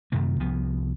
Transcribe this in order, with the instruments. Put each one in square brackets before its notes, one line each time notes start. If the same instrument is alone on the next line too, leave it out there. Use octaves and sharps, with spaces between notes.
[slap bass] F#2 C3 D#3 A3
C2 F3 B3